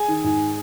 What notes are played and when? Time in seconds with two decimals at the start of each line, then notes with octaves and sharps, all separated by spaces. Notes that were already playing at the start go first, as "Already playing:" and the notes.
Already playing: G#4 G#5
0.08 D#3
0.24 G#2